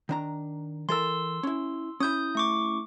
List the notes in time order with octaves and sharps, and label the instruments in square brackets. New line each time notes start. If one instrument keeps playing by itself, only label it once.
[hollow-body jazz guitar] D#3 D4 A#5
[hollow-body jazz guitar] E3 A4 A#4 [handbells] C6 E6
[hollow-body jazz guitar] C#4 E4
[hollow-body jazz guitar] C#4 E4 [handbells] D#6 G6
[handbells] A3 C#6 D6